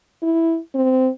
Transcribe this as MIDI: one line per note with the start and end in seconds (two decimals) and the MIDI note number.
0.23 0.58 64
0.75 1.09 60